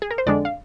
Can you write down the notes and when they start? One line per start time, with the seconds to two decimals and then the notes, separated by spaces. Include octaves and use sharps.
0.02 G#4
0.11 A#4
0.18 C5
0.26 F2 D3 G#3 D4 D5
0.45 F5